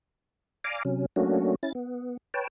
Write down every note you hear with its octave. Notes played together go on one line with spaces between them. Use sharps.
D5 F5 G#5 A#5 D6
C3 F#3 C#4
F#3 A3 A#3 C#4 D4 F#4
C#4 E4 A6
B3
B4 C#5 G5 A5